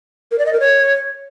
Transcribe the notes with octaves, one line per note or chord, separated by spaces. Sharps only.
A#4
D5
D#5
A#4
C#5